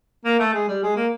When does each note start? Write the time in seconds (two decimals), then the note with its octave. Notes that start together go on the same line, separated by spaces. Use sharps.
0.25 A#3
0.39 A3
0.53 G#3
0.68 G3
0.83 G#3
0.96 A#3